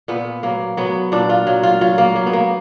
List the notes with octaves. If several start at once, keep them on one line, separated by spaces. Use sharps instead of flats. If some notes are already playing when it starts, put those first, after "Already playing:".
A#2 B3
F#3 A#3
F#3 B3
A#2 D4
F4
F#3
F4
F#3 F4
A#3
F#3
B3
A#3